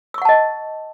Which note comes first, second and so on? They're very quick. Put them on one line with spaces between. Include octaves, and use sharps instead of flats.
E6 C#6 F#5 A5 D#5